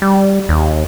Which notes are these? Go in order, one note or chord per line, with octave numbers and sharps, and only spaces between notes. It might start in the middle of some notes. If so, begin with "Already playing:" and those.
G3
D#2